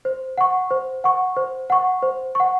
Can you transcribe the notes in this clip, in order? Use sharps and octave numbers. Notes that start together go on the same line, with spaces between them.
C5
F#5 C#6
C5
F#5 C#6
C5
F#5 C#6
C5
F#5 C#6